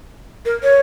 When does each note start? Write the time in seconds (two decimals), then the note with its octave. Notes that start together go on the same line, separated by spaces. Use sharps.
0.45 A#4
0.63 C#5